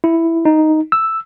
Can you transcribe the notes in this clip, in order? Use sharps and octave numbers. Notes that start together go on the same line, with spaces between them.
E4
D#4
E6